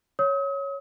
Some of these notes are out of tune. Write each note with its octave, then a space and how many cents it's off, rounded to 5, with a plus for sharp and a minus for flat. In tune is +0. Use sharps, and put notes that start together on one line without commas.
C#5 +0 D#6 +40